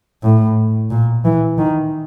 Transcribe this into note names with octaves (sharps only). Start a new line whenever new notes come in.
A2
A#2
E3
D#3